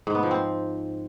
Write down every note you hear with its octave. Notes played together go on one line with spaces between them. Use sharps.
G#2
B3
F3
C4